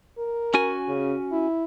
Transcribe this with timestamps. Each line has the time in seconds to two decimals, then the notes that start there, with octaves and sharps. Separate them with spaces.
0.18 A#4
0.54 C#4 F#4 G#5
0.88 C#3
1.32 E4